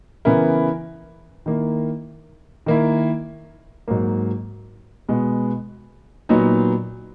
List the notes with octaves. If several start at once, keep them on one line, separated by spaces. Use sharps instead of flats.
C#3 E3 B3 E4 A#4
D#3 A#3 E4
D#3 A#3 E4
G#2 F#3 A#3
B2 G#3 B3
A#2 F#3 B3 D#4